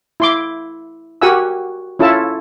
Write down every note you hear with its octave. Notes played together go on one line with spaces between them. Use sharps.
E4 C6 D6
F#4 G4 A#4 F#5 G#5 E6
C#4 E4 F4 A4 A5